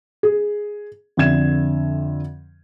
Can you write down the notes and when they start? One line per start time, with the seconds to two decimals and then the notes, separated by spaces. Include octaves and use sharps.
0.23 G#4
1.17 F2 D3 E5 G#6 E7